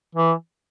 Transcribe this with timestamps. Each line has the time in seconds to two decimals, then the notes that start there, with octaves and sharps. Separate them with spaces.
0.15 E3